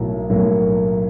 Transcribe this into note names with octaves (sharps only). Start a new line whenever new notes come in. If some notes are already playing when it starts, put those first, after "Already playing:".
Already playing: B1 A2 F#3 A#3
B1 A2 F#3 A#3